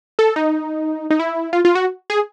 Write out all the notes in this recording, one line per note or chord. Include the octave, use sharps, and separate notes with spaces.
A4
D#4
D#4
E4
F4
F4
F#4
G#4